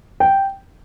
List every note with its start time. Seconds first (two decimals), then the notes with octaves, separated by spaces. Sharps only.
0.20 G5